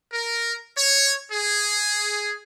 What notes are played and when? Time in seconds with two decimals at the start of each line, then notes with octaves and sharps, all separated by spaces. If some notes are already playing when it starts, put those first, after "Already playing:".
0.11 A#4
0.75 C#5
1.31 G#4